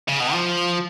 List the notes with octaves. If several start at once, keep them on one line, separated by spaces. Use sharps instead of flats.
C#3
B2
F3